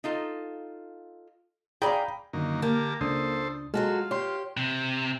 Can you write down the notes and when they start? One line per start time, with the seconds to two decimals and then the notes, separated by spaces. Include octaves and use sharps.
0.04 D#4 F4 A4
1.82 G#4 D5 F5 G5 A#5 B5
2.33 F#2 D3 D#3 A#3
2.62 A#3 G4 A#4 A5
3.01 C#2 D4 A4 C5 D#6
3.74 F#3 G#3 F4 F#4 A4
4.11 G4 C#5 C6
4.57 C3